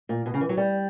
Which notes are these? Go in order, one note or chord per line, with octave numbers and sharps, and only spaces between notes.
A#2
B2
C#3
E3
F#3
G3